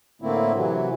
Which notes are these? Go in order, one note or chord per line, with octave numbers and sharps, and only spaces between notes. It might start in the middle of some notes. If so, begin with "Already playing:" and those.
A2 D3 A3 A#3 C4 E4
C3 E3 F#3